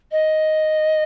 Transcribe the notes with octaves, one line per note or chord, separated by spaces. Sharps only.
D#5